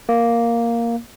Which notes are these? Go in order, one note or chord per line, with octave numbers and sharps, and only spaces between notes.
A#3